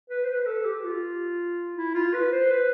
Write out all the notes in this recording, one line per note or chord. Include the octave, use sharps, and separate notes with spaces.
B4
C5
B4
A4
G4
F4
E4
F4
B4
C5
B4